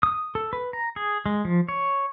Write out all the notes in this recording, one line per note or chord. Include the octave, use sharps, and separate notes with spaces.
D#6
A4
B4
A#5
G#4
G#3
F3
C#5